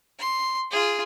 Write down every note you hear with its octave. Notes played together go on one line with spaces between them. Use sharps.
C6
F4 G#4